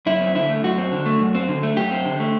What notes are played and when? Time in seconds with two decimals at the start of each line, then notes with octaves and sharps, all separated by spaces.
0.06 F#2 E4
0.21 C4
0.35 D3 E4
0.49 A3
0.63 F#2 F#4
0.78 C4
0.92 D3
1.06 A3
1.20 F#2
1.35 C4
1.48 D3
1.63 A3
1.77 F#2 G4
1.92 C4
2.05 D3
2.20 A3